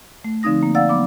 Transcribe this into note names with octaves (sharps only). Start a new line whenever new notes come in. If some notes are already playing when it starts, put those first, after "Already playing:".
A3
D3 F3 C4 D#4 D#6 A#6
A#3
D5 F5 F#5 E6 A6
F#3 B3 D6